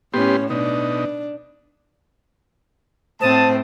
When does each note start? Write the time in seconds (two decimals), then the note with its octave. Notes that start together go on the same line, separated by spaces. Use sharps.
0.14 A2 B3 C#4 G4 C6
0.50 B2 D4 D#4
3.21 A2 C4 C5 A5 D#6